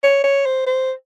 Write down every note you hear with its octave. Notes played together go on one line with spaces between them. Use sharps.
C#5
C#5
C5
C5